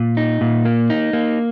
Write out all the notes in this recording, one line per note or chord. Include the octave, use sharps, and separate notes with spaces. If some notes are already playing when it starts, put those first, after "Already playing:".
Already playing: A#2
D#4
A#2
A#3
D#4
A#3